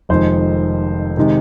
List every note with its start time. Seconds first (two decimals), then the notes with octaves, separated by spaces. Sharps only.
0.09 F1 F2 D#3 G#3 C5
1.17 C3 D#3 G#3